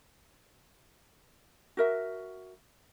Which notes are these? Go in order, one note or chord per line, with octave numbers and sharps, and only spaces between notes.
F#4 A#4 E5